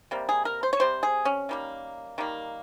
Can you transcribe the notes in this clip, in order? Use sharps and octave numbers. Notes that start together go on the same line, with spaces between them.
C3 G3 A#3
G#4
A#4
C5
C#5
C3 G3 C5
G#4
C#4
D#3 G3 A#3
D#3 G3 A#3